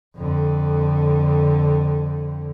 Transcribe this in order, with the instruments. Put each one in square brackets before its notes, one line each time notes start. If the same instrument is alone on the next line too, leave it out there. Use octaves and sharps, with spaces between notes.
[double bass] F2 D3